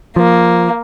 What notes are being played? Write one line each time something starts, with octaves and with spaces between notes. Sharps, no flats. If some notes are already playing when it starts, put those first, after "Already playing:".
F3 A#3